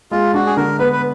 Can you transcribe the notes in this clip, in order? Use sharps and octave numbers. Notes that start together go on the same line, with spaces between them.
G#3 F4
D4 F#4
G#4
D3 A#4
B3 B4
B4